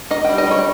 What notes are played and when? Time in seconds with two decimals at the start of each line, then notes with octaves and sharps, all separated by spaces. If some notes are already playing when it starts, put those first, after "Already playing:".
0.11 D#4 D#5
0.25 G5
0.29 G3
0.38 D#5
0.47 G3 C#5